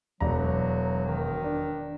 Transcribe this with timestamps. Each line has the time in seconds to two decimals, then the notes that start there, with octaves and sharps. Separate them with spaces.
0.20 E1 F#3 D5 A#5
1.07 D#3
1.44 D4